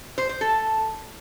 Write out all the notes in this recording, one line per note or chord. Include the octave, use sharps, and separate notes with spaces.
C5
C5
A4